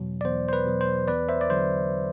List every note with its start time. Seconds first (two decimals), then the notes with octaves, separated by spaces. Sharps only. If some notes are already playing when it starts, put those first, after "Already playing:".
Already playing: E2 B2 F#3
0.21 D5
0.25 E2 C5
0.49 C5
0.53 B4
0.66 B2 F#3
0.81 C5
1.08 E2 B4 D5
1.29 C5 E5
1.41 D5
1.49 D3 F#3 C5